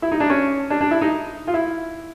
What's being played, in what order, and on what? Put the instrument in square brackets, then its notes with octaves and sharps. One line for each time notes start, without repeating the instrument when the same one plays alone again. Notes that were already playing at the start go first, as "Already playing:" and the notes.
[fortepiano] E4
D#4
D4
C#4
D4
D4
E4
D#4
F4
E4